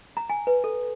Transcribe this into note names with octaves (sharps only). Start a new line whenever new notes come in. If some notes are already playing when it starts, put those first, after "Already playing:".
A#5
G#5
B4
A4